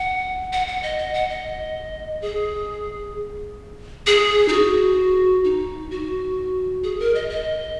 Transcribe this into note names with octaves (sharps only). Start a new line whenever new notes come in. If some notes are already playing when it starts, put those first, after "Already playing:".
Already playing: F#5
F#5
F#5
D#5
D#5
F#5
D#5
G#4
G#4
D#4
F#4
D#4
F#4
G#4
A#4
D#5
D#5